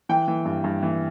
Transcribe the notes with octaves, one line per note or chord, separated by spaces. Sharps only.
E3 G5
E3
G2
G2
E3